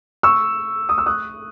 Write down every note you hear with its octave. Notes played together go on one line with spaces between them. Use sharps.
C#6 E6
D#6
E6
D#6 F#6